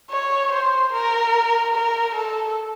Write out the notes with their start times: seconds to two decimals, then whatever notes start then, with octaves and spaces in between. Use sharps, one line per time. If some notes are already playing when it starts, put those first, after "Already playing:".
0.11 C#5
0.52 C5
0.93 A#4
1.74 A#4
2.14 A4